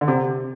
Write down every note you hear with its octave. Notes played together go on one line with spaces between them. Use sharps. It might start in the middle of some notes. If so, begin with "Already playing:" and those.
D3
C3